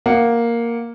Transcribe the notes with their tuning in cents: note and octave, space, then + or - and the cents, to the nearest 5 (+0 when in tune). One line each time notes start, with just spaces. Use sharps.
A#3 +0 F#5 +0